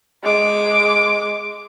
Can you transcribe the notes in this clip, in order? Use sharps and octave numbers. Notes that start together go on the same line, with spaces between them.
G#3 D6